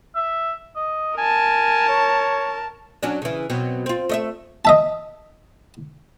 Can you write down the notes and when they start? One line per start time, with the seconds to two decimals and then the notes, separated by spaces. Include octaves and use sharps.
0.16 E5
0.76 D#5
1.18 A#4 G#5 A5
1.89 C#5
3.03 F#3 C#4 D4
3.22 C#3 E3
3.50 B2 F#3 C4
3.86 C4 F4
4.09 A3 D#5 E5
4.65 D#5 E5 A5